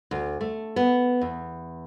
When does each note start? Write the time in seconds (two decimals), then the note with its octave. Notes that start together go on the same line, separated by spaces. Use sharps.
0.11 D2
0.41 A3
0.76 B3
1.21 E2